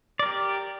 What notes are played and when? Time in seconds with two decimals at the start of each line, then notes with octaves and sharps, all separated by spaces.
0.19 D5
0.23 A#4
0.26 G4